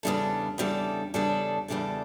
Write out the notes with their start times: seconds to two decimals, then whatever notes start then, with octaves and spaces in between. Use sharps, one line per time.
0.03 E2 C#3 G3 D4 A4
0.58 E2 C#3 G3 D4 A4
1.14 E2 C#3 G3 D4 A4
1.68 E2 C#3 G3 D4 A4